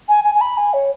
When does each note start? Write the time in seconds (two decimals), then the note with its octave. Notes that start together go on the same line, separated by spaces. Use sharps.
0.09 G#5
0.24 G#5
0.35 G#5
0.41 B5
0.57 G#5
0.74 C#5